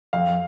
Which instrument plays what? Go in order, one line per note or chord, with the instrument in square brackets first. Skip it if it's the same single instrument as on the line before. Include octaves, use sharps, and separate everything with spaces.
[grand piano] F2 [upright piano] F5